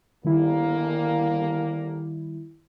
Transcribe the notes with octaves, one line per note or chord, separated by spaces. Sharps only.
G1 D#3 G3 A#3 E4